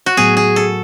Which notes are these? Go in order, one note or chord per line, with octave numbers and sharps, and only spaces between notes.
F#4
A2 F#3 B3 G#4
G#4
A4